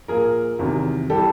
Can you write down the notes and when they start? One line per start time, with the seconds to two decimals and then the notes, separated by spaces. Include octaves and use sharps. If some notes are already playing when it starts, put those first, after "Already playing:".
0.08 A#2 F3 G#4 A#4
0.59 E2 C3 D#3 F#3
1.10 E3 G3 G4 A4